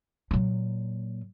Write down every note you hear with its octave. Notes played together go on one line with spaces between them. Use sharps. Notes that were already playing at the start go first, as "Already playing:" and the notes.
A#2 F#3